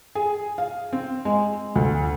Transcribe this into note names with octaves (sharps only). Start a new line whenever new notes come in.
G#4
F5
C4
G#3
D2